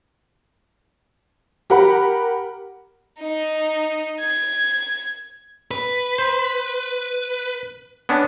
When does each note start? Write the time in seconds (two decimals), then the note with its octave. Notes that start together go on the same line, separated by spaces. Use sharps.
1.70 G4 A#4 F#5 B5
3.19 D#4
4.20 G#6
5.71 B4
6.18 C5
8.09 B3 C#4 D4